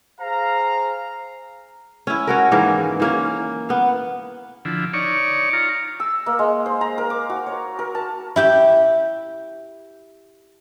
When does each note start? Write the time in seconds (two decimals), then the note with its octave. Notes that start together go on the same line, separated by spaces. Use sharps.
0.20 G#4 C5 F5 A#5
2.07 C#4 E4
2.27 C#4 F#4 A#4
2.52 G#2 D#3 E3 A#3
3.00 E3 A#3 C#4
3.69 B3 F5
4.65 D3 F3 E4
4.93 D#4 C#5 D5 C#6
5.53 F4 A#5
6.00 E6
6.26 A#3
6.39 G#3
6.66 C5
6.81 A#5
6.98 A#4
7.10 D6
7.30 F#4
7.46 C#5
7.79 A#4
7.95 A5
8.36 E4 G4 G5